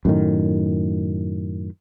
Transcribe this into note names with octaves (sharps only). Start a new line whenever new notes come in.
F#2 A2 D#3